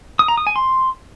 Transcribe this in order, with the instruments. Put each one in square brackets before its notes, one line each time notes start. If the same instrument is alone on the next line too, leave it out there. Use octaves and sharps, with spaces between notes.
[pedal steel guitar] D#6
A#5
D#6
G#5
C6